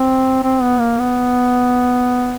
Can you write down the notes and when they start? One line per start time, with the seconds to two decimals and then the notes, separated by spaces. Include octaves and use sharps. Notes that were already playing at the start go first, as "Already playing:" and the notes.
Already playing: C4
0.43 C4
0.62 B3
0.79 A#3
0.99 B3